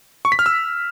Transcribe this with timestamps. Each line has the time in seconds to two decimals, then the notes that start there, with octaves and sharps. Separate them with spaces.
0.25 C#6
0.32 B6
0.39 F6
0.46 E6